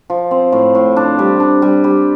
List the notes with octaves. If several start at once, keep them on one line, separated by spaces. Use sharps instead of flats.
F3
C4
A2
A2
D4
G3
D4
G3
G3